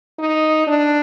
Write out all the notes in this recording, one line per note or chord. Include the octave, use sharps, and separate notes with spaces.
D#4
D4